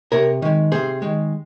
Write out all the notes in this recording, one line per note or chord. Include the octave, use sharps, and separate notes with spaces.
C3 A#4 C#5
D#3 G#3
C3 G#4 C5
D#3 G#3